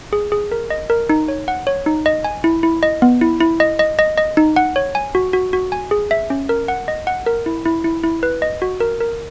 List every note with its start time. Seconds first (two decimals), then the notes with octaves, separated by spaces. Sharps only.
0.13 G#4
0.32 G#4
0.52 A#4
0.70 D#5
0.90 A#4
1.09 D#4
1.28 C#5
1.48 F#5
1.67 C#5
1.86 D#4
2.06 D#5
2.24 G#5
2.44 E4
2.63 E4
2.83 D#5
3.02 B3
3.21 E4
3.41 E4
3.60 D#5
3.79 D#5
3.99 D#5
4.18 D#5
4.37 D#4
4.56 F#5
4.76 C#5
4.95 G#5
5.15 F#4
5.33 F#4
5.53 F#4
5.72 G#5
5.91 G#4
6.11 E5
6.30 C#4
6.49 A#4
6.68 F#5
6.88 D#5
7.07 F#5
7.26 A#4
7.46 E4
7.65 E4
7.84 E4
8.04 E4
8.23 B4
8.42 D#5
8.62 F#4
8.80 A#4
9.00 A#4